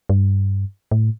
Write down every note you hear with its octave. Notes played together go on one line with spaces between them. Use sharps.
G2
A2